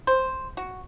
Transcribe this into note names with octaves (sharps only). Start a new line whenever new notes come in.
C5
F#4